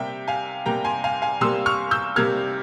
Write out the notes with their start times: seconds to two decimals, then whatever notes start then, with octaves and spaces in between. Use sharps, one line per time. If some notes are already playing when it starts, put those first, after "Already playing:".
Already playing: C3 G3 A#3 E5 G5
0.28 F5 G#5
0.66 C3 G3 A#3 G5 A#5
0.84 G#5 C6
1.04 F5 G#5
1.22 F5 G#5
1.41 C3 G3 A#3 C6 E6
1.66 C#6 F6
1.91 E6 G6
2.16 C3 G3 A#3 F6 G#6